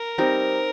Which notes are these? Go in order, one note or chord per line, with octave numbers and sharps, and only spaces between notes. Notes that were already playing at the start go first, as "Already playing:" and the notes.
Already playing: A#4
G3 C4 D#4